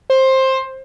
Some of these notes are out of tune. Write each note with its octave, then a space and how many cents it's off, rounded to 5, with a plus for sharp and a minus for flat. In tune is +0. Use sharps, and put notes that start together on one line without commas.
C5 +15